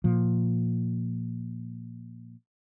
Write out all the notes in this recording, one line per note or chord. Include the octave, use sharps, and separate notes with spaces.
A#2 F3